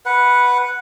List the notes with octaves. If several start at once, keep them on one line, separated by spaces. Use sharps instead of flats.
B4 F#5